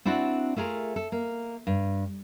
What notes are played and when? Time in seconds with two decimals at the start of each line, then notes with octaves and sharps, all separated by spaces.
0.05 C4 D4 E4 F#4 D5 F#5
0.56 A3 F4 G#4 A#4
0.96 A4
1.12 A#3
1.67 G2